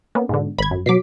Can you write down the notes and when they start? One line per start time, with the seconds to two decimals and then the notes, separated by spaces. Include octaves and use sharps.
0.15 A#3 B3 C#4
0.29 G#2 B2 D3
0.58 G#1 B5 G#6
0.71 F#2
0.86 B2 F#3 D6 B6 C7